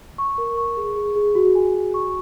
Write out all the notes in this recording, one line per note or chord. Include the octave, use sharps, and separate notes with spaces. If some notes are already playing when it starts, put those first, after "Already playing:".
C#6
A#4
C#6
G#4
G#4
G#4
F#4
G#5
F#4
C#6